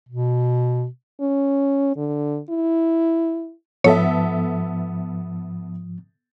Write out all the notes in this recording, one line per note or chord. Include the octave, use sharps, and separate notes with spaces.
B2
C#4
D3
E4
G#2 F3 B3 A4 C#5 E5